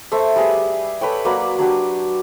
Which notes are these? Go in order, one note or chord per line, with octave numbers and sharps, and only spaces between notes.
A3 A4 C5 E5
G3 G4 G#4 B4
A4 B4 C#5 G5
F#3 A#3 B4 D5
F#3 D4 G4 B4